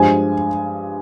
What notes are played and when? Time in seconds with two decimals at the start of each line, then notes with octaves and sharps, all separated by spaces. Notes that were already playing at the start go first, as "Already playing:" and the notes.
Already playing: G2 F3 G#3 G#5